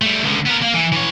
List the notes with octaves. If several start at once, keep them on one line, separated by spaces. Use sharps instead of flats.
G3 A3
C#2 D3
B3 A#4
A#3
E3
E3 C#5